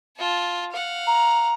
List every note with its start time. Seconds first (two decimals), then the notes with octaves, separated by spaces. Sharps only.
0.16 F4 A5
0.71 F5 F#5
1.06 A#5